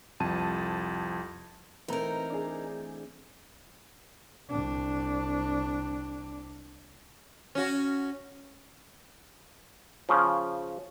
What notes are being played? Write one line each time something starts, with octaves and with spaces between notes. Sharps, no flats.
C2 F2 A5 D#7
E3 A3 C4 D#4 A#4 B4 A#5
D4 G#4
C2 D4
C#4 F#4
C#3 F3